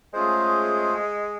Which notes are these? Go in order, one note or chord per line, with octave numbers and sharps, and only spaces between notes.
G#3 A3 C#4 F4 G#4 C5